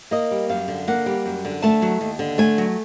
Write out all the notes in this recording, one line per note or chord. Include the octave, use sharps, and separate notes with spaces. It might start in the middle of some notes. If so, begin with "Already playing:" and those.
A#3 D#5
G3
F#2 F5
D3
A#3 F#5
G3
F#2
D3
A3 A5
F#3
D#2
D3
A3 G#5
F#3